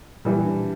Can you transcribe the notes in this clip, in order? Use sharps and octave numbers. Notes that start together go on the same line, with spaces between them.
A#2 E3 G3
D4